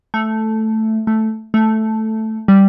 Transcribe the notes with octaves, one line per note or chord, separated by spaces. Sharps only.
A3
A3
A3
G3